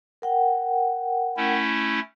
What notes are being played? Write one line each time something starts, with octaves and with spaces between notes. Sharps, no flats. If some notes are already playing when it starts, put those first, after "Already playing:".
A#4 F#5 G5
A3 C#4 E4